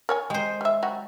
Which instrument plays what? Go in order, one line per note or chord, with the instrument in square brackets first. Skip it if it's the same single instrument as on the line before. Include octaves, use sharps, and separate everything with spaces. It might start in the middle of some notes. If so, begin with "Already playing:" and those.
[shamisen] A#4 C#5 G#5
[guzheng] G#3 C5 [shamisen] G4
[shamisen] G3 E5
F#3 G3 F#4